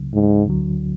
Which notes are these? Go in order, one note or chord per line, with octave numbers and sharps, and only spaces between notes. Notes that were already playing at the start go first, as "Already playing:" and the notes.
Already playing: C#2 C#3 F#3
G#2
D2 D3 F#3